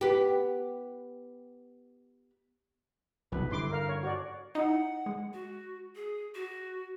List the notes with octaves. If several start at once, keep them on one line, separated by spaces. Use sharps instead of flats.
B3 G4
B1 F2 C3 B4
G2 D3 E4 C6 D6
A#4 F5
C#5
F#4 C#5 D5
D#4 E4 F#5
G#3
F#4
G#4
F#4